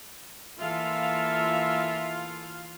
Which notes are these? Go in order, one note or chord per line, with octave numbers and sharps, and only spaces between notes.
E3 A#3 F4 A4 E5 F5